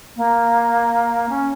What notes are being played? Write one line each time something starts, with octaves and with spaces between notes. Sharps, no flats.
A#3
C#4